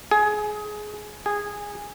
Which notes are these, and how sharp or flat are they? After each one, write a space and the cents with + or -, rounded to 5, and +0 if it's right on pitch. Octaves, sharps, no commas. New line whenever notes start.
G#4 +20
G#4 -10